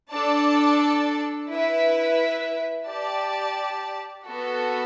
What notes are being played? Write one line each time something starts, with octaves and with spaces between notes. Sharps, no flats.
D4 A4 D5 A5
E4 B4 E5
G4 D5 A5
B3 F#4 A4